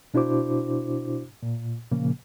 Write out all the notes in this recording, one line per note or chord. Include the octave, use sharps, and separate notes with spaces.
B2 D4 E4 F#4 C5 D6
A#2
A#2 C#3 F3 A#3